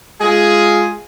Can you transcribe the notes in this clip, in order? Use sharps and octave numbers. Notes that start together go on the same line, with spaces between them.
G#3 F4 G#4